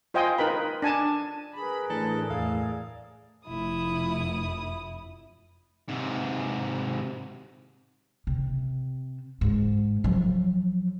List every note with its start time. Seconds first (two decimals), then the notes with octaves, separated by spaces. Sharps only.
0.14 F4 C5 D#5 G5 G#5
0.38 D#4 A#4 B4 B5
0.82 D4 G#5 A5
1.57 G#4 A#4 B4 B5
1.90 A2 E3 A3 D4 A4
2.30 E2 G#4 A#4 D5 E5 F5
3.47 F1 E4 D#6
5.89 G#2 C3
8.27 C3
9.41 G#2
10.04 F3 F#3